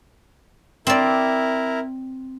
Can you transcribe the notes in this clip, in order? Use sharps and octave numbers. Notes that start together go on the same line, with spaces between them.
C4 E4 A#4 D5